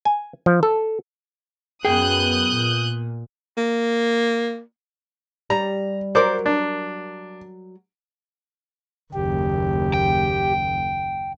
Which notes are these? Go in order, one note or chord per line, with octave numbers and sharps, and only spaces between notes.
G#5
F3
A4
F#2 B3 G#4 G5 D#6 F#6 G6
A#2
A#3
G3 A#5
F#3 A#4 C5 D5 D6
D4
F#1 D#2 G4
G5